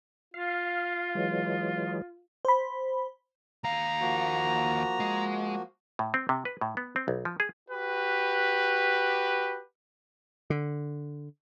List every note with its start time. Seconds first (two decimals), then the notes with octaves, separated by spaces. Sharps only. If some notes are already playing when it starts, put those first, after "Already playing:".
0.34 F4 F5
1.15 E3 F#3 G#3
2.45 C5 B5
3.64 D#2 F5 A#5
4.01 F3 A#3 F#4
5.00 G#3
5.99 A2
6.14 C4
6.29 C3
6.45 B4
6.61 A2
6.77 B3
6.96 C4
7.08 B1
7.25 F3
7.40 G#4
7.69 F#4 G4 B4
10.50 D3